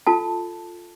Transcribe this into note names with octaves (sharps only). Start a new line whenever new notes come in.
F4 A4 A5